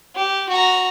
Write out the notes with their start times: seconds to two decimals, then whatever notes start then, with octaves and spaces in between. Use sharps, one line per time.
0.15 G4
0.49 F#4 A#5